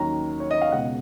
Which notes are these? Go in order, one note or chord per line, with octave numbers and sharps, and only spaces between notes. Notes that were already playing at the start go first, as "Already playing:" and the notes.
Already playing: D#2 D#3 F#3 C#4 A#5
C#5
D#5
F5
C#2 B2 G#3 F#5